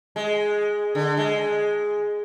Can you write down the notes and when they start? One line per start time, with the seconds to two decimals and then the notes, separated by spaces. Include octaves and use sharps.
0.16 G#3
0.95 D3
1.17 G#3